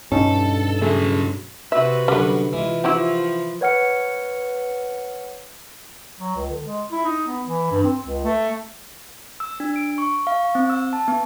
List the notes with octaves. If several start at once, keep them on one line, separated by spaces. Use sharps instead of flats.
G2 B2 C#4 D#4 A4
C#3 F#3 A3 G#4 A4
C3 F#4 B4 E5
F#2 D3 G3 B3
E3 G#3 F4
F3 E4 F#4 G4
B4 C#5 F#5 F6 C#7
F#3
C#2
D3
G#3
E4
D#4
B3
E3
G2
C4
C#2
A3
E6
D4
D7
C#6
F5
C#6
C4
E6
A5
B3